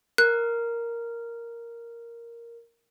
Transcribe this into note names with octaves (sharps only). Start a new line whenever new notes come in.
A#4 F#6